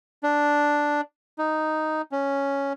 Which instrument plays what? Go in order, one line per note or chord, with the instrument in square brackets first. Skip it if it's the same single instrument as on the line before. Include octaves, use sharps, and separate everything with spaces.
[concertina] D4
D#4
C#4